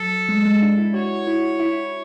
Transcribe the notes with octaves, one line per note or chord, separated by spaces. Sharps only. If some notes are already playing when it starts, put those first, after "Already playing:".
Already playing: F#3 A4
G#3
G#3
D4
E4
F#4 C#5
E4
E4